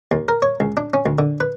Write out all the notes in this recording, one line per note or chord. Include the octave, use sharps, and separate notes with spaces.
D#2
A#4
C#5
C#2
D4
C#4
D2
D3
B4